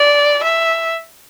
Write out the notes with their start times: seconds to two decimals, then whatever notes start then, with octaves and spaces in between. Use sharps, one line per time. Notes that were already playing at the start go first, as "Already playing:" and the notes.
Already playing: D5
0.43 E5